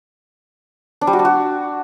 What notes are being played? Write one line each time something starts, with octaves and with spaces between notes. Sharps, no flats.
D4
G3
F#4
D4
F#4